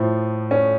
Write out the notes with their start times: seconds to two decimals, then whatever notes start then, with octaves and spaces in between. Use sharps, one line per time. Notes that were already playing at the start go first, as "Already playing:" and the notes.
Already playing: A2 F3
0.51 C#4